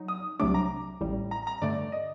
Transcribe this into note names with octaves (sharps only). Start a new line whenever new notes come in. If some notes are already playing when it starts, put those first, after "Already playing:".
Already playing: F#3 D#4
D#6
C2 C3 F#3 A3 D4 D6
A#5
A1 A2 G3
A#5
A#5
G2 D3 A3 D5
D5
D#5